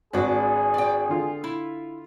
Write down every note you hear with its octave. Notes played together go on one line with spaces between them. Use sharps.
G#1 D4 F#4 G#4 B4
D5 G5
D3 F4
E4